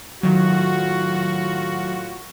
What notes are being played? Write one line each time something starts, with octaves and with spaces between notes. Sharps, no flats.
A2 D#3 F#3 F4 F#4